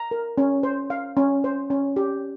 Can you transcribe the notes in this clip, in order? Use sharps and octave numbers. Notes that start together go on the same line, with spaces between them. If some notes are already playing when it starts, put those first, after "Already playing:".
Already playing: A#5
A#4
C#4
C5
F5
C#4
C5
C#4
G4